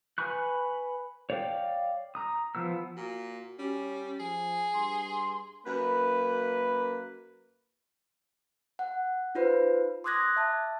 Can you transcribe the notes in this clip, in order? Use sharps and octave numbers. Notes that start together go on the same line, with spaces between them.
B4 G#5 B5 C#6 F#6
C#5 D5 F5 G5
A#5 D#6
F3 B3 E6
A#2 F#4
G3 C#4
F3 G#4
G2 C6
F#2 A#3 B4
F#5
D#4 F4 B4 C5
C6 D6 D#6 F#6 G#6 A#6
E5 A5